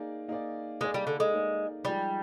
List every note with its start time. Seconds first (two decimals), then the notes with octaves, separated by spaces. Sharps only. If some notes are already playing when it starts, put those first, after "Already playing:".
Already playing: A#3 D#4 G#4 D5
0.28 A#3 D#4 G#4 D5
0.80 G#3 A#3 D#4 G#4 D5
0.94 G3
1.07 D3
1.20 G#3
1.32 A#3 D#4 G#4 D5
1.85 F3 G3 G#3 D#4 G#4 D5